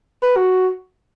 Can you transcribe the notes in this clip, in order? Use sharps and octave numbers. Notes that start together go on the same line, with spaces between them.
B4
F#4